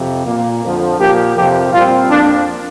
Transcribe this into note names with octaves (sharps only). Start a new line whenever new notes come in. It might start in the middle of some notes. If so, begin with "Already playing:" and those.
Already playing: F2 C3 F3
A#2 A#3
F2 D3 F3
A#2 F3 A#3 G4
F2 C3 F3 C4 G4
A#2 G3 C4 F4
F2 F3 A#3 D4